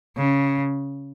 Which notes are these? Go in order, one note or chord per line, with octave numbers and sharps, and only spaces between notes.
C#3